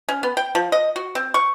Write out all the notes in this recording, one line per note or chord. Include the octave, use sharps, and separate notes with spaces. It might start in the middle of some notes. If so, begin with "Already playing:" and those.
C#4
B3
G5
F3
D#5
F#4
C4
C#6